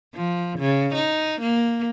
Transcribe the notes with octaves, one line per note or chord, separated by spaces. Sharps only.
F3
C#3
D#4
A#3